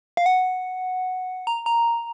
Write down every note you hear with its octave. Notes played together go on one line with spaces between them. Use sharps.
F5
F#5
A#5
A#5